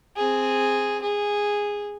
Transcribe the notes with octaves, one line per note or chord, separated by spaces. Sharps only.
C4 G#4
G#4